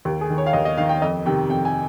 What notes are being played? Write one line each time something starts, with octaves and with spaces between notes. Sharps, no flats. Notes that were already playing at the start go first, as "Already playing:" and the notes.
D#2 G4
G#4
D#3
C#5
F5
D#2 D#5
D#5
D#3 F5
G5
F2 D#5
C3 D#3 G5
F2 G5
G#5